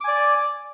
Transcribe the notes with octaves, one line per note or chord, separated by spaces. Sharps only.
D5 G#5 D6